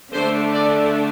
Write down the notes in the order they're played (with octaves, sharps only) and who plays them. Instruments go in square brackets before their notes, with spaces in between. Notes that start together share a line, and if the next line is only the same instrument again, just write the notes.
[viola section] D3 A3 D4 C5
D5